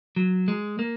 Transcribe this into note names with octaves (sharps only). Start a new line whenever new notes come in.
F#3
G#3
A#3